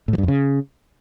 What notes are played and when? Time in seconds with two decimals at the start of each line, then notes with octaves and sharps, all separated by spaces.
0.08 A2
0.13 F3
0.18 G2
0.23 F2
0.28 C#3